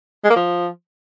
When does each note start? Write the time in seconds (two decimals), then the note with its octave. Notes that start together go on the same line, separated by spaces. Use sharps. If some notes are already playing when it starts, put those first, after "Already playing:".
0.24 G#3
0.30 A#3
0.36 F3